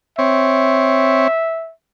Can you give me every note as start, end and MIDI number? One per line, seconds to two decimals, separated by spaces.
0.19 1.28 60
0.19 1.28 73
0.19 1.72 76